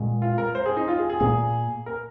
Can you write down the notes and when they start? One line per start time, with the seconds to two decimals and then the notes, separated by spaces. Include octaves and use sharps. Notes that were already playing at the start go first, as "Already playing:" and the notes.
Already playing: A#2 G#3 C4
0.22 F4
0.38 A#4
0.55 C5
0.66 G#4
0.77 D#4
0.88 F4
0.99 G#4
1.09 G#4
1.20 A#2 A#3 G#4
1.86 A#4